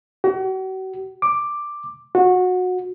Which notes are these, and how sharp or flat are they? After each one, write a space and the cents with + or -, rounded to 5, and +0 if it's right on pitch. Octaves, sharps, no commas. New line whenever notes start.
F#4 +40
D6 +5
F#4 -20